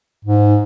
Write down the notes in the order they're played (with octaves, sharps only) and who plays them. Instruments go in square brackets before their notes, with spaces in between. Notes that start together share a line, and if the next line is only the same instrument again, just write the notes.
[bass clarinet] G#2